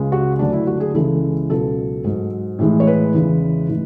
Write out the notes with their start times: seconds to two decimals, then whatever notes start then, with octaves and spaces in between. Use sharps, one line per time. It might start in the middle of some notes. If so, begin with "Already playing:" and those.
Already playing: C#2 C#3 G#3
0.12 F#4
0.39 D2 D3 F#3 D4
0.53 E4
0.67 F#4
0.80 G#4
0.94 C#2 C#3 E3 G#3 A4
1.50 C#2 B2 F#3 A4
2.04 G#2 F#3
2.59 A2 E3 G#3
2.80 C#5
2.87 B4
3.14 E2 C#3 E3 G#3
3.68 A2 E3 G#3